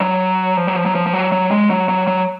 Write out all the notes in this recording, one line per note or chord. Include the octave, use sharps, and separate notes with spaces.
F#3
F3
F#3
F3
F#3
F3
F3
F#3
F#3
G#3
F#3
F#3
F#3